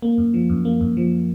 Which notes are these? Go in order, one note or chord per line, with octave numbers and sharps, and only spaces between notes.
A#3
F#2
F3
F#2
A#3
F#2
F3